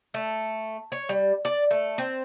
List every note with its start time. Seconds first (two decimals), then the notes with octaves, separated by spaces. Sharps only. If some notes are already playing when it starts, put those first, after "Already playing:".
0.14 A3
0.92 C#5
1.09 G3
1.45 D5
1.71 A3
1.98 C4